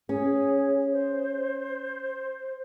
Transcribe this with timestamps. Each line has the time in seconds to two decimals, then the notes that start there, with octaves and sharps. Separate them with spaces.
0.09 C#4 G#4
0.92 C5